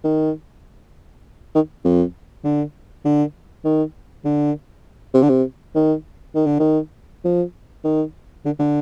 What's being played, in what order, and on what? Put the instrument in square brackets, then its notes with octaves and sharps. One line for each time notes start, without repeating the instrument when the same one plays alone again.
[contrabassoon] D#3
D#3
F2
D3
D3
D#3
D3
C3
D3
C3
D#3
D#3
D3
D#3
F3
D#3
D3
D3